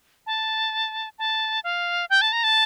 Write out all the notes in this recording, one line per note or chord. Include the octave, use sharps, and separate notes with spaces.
A5
A5
F5
G5
A5
A#5
A5